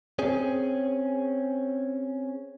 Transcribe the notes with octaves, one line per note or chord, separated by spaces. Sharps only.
C4 C#4 G#4